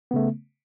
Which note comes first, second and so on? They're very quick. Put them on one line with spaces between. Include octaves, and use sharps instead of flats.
B3 C#3 A3